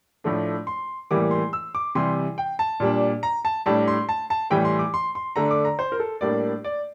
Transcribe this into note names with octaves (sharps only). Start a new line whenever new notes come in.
A2 F3 A3 D4
C6
A2 E3 G3 A#3 D6
C6
E6
D6
C3 E3 G3 C6
G5
A5
A#2 G3 D4
A#5
A5
A2 G3 D4 A5
C6
A5
A5
A2 E3 G3 G5
C6
D6
C6
C6
D3 A3 D4 A#5
D6
A#5
C5
A#4
A4
A2 G3 A#3 D4 D5
D5